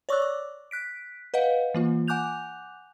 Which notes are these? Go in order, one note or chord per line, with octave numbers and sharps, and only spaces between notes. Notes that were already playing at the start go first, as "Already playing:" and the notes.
C#5 D5 C#6 D6 E6 F#6
D6
F#6 B6 D7
B4 D#5 F5 F#5
E3 A#3 F4
F#5 G#5 D6 F#6 G6 F7